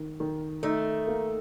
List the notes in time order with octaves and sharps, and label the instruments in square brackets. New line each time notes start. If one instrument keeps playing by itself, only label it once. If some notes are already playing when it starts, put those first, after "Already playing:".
Already playing: [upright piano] D#3
D#3
[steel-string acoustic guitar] A3 [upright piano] D#4
[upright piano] A#3